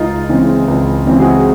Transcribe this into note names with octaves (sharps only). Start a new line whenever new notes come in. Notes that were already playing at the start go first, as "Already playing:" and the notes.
Already playing: C#2 D#4 F4
C#3 E3 G#3 C4
C#2
C#3 E3 G#3 C4
F#4 G#4